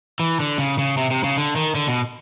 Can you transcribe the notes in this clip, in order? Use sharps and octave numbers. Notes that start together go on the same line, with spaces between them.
E3
D3
C#3
C#3
C3
C3
C#3
D3
D#3
D3
B2